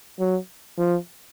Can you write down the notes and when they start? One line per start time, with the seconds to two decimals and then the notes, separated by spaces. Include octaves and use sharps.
0.19 F#3
0.78 F3